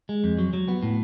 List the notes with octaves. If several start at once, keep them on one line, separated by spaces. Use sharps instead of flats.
G#3
F2
F#3
F#3
B3
A2